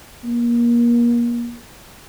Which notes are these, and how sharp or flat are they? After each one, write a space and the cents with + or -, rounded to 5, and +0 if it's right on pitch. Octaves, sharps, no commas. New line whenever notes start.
A#3 +30